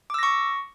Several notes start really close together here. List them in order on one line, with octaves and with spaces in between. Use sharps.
D6 E6 A#6 C#6